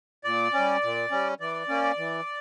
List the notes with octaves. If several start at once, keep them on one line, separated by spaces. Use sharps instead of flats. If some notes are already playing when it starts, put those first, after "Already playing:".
A#2 D5
G3 C#4
A#2
G3 C#4
E3 D5
A#3 C#4
E3